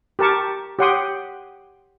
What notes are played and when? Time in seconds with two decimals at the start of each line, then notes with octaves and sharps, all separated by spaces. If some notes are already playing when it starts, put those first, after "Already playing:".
0.19 G4 A#4 A5 C#6
0.79 G4 C#5 F#5 G5 C6 D#6